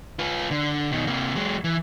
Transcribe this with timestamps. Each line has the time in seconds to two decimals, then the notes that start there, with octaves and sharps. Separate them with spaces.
0.19 F4 B4
0.51 D3
0.91 B2 D#3
1.07 C3 A#3
1.35 F#3 G#3
1.64 E3